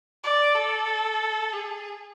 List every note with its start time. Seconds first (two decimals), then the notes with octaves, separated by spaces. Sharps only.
0.23 D5
0.55 A4
1.53 G#4